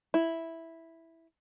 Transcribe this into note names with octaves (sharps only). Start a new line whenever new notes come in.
E4